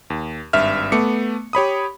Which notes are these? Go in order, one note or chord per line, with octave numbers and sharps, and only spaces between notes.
D#2
G#1 G2 E5 F6
A3 B3 D6 C#7
G4 C#5 B5 D#6